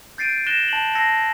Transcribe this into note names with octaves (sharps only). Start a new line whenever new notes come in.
G6 A6 C7 D7 D#7
F#6 A6 A#6 E7 G7
A5 F#7
A5 E6 G#6 A#6 C7 C#7